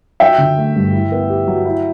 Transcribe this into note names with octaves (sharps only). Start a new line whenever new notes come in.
F#3 E5 G5
D3
A3
G2
E4
B3
G4
F#3
E4